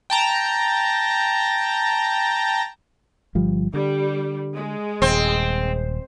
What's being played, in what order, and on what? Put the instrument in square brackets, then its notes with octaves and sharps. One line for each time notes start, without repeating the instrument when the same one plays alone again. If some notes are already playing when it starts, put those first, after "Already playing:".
[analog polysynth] G5 A5 A#5
[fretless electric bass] G1 F3 G3
[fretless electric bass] D3 [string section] G3
[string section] G#3
[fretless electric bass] D#1 [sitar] C4